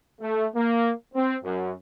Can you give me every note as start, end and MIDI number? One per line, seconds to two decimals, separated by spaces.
0.21 0.46 57
0.55 0.91 58
1.14 1.37 60
1.43 1.71 42